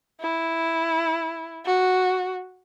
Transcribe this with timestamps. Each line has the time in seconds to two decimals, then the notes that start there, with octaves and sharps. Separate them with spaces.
0.21 E4
1.65 F#4